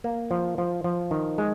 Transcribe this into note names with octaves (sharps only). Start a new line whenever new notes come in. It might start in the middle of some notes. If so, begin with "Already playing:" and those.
A#3
F3
F3
F3
D#3
G#3